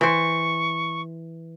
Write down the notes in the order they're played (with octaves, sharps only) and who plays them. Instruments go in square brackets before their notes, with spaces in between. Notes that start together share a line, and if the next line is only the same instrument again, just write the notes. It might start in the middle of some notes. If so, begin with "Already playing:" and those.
[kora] E3 C5 [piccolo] C#6